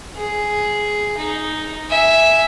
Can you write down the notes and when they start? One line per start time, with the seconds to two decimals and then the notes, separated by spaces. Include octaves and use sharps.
0.16 G#4
1.17 D#4
1.90 E5 G#5